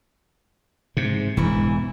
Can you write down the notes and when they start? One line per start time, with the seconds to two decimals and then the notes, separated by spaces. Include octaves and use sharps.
0.97 G#2 C3
1.37 E1 G#2 E3